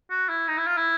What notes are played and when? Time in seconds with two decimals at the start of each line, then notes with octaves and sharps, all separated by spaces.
0.10 F#4
0.29 E4
0.48 D#4
0.58 E4
0.67 F4
0.77 E4